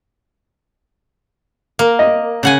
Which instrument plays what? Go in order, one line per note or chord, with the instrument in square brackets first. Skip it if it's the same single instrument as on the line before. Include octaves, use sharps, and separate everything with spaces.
[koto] A#3
[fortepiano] D#5
[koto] C#3 F#5 G#5